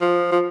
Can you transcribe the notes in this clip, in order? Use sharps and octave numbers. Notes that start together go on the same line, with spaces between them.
F3
F3